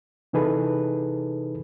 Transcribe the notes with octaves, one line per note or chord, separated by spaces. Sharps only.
C3 E3 D#4 G#4 A4 B4